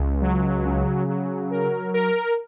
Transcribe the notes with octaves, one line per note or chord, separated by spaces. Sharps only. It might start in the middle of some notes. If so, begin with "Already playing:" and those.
Already playing: C#2
F#3
C#3
F#3
A#4
A#4